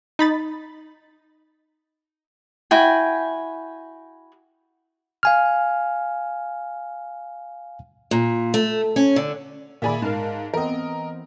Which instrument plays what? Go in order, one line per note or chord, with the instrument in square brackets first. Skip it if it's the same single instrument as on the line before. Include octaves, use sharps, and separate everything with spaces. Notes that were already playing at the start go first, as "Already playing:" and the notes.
[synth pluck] D#4 B5 A6
[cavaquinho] E4 F#4 G5 G#5
[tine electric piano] F5 G#5 F6
[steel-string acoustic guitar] A#2
A3
C#4
D3
[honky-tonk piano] A#2 G#4 B5 [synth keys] D#3 D5 E5
[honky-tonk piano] G#2 [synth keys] A#4 F5 A5
[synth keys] E3 B3 C4 [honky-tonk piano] A#4 D#5